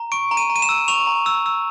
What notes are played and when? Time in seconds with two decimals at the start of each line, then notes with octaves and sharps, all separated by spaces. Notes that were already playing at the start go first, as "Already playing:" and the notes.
Already playing: A#5
0.12 C#6 D7
0.31 A#5
0.37 D#7
0.50 A#5
0.56 D#7
0.62 E7
0.69 E6
0.88 C#6 F7
1.07 A#5
1.26 E6
1.46 E6